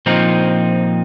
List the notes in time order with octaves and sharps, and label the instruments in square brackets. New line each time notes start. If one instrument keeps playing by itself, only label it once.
[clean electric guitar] A#2 F3 C4 D#4